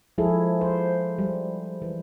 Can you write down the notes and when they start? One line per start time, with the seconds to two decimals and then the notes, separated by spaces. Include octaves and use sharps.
0.18 F3 G#3 E4 G#4 A4
0.61 C5
1.19 G3
1.82 E3